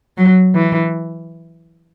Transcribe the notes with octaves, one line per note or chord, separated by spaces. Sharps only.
F#3
E3